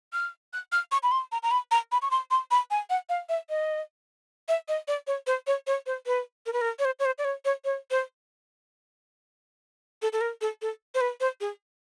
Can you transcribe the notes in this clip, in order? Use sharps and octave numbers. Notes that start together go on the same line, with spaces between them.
F6
F#6
F6
C#6
B5
C6
A#5
A#5
B5
A#5
B5
C#6
C6
C6
B5
G#5
F#5
F5
E5
D#5
E5
D#5
D5
C#5
C5
C#5
C#5
C5
B4
A#4
B4
A#4
C#5
C5
C#5
C5
D5
C#5
C#5
C#5
C5
A4
A4
A#4
A4
A4
C5
B4
C5
G#4